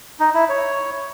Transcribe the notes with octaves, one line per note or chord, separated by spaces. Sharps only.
D#4
E4
C#5